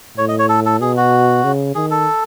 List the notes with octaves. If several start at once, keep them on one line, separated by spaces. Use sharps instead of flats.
A2 C#5
D#5
C#5
A4
A4
B2 G#4
F#4
C#3
D#3 G#4
A4